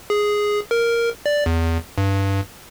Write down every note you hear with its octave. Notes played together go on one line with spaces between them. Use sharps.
G#4
A#4
D5
E2
G2